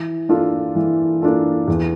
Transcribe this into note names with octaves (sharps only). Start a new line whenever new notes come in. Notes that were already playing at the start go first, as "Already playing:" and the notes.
Already playing: E3
A#3 D4 F4 A4
E3
A#3 D4 F4 A4
E2